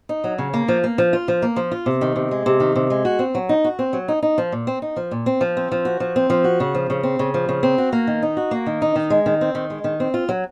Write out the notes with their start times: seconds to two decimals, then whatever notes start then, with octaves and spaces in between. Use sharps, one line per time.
0.09 D#4
0.24 F#3
0.38 C#3
0.54 A#3
0.68 F3
0.84 A#3
0.98 F3
1.13 F4
1.28 F3
1.42 A#3
1.56 F3
1.72 F4
1.86 C3
2.01 D#3
2.16 C3
2.31 G#3
2.46 C3
2.60 D#3
2.76 C3
2.90 G#3
3.05 F#4
3.19 C4
3.35 F#3
3.49 D#4
3.64 F#4
3.79 C4
3.93 F#3
4.08 D#4
4.22 D#4
4.38 F3
4.52 A#2
4.67 C4
4.82 D#4
4.96 F3
5.11 A#2
5.26 C4
5.41 F3
5.57 C4
5.72 F3
5.85 F#4
6.00 F3
6.16 C4
6.30 F3
6.44 F#4
6.60 C#3
6.75 F3
6.90 C#3
7.03 C4
7.19 C#3
7.34 F3
7.49 C#3
7.63 C4
7.78 F#4
7.93 A#3
8.07 D#3
8.23 D#4
8.37 F#4
8.51 A#3
8.66 D#3
8.82 D#4
8.96 D#3
9.10 G#3
9.26 D#3
9.41 C4
9.55 D#3
9.70 G#3
9.84 D#3
10.00 C4
10.14 F4
10.29 F#3